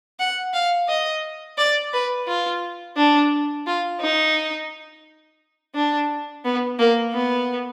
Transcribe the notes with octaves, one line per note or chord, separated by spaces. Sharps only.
F#5
F5
D#5
D5
B4
F4
D4
F4
D#4
D4
B3
A#3
B3